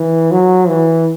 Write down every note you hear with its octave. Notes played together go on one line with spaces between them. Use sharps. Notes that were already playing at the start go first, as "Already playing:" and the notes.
Already playing: E3
F#3
E3